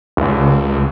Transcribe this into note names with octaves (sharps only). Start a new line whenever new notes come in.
C#2